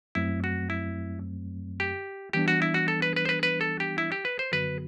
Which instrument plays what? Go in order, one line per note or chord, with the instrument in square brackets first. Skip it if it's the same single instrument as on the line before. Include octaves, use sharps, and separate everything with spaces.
[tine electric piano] F#2 F#3 A3 C4 [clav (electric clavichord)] E4
[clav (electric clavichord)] F#4
E4
G4
[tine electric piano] E3 G3 B3 D4 [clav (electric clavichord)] G4
[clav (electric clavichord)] F#4
E4
F#4
A4
B4
B4
C5
B4
B4
A4
G4
E4
G4
B4
C5
[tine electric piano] F#2 D3 F#3 B3 F#4 [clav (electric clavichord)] B4